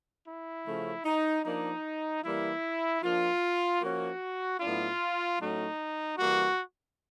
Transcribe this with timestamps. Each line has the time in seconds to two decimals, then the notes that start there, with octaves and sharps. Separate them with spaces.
0.25 E4
0.64 C#3 F3 A3 C#4
1.04 D#4
1.43 F3 A#3 D4 D#4
2.22 E3 G3 A#3 E4
3.02 F3 A#3 D4 F4
3.80 F3 A#3 C#4 F#4
4.60 A2 F#3 B3 D4 F4
5.38 A2 F#3 A3 C#4 D#4
6.18 E3 G3 A#3 F#4